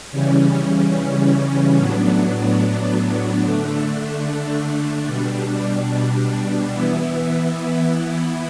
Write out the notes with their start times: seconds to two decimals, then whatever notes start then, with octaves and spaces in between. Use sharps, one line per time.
0.11 C#3 E3 G3 C#4
1.76 A2 F#3 B3 D4
3.41 D3 A3 D4
5.07 B2 G3 D4
6.72 E3 B3 E4